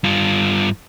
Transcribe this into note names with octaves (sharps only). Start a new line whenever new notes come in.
G2 F4